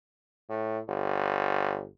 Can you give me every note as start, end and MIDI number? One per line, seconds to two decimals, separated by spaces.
0.49 0.79 45
0.89 1.86 31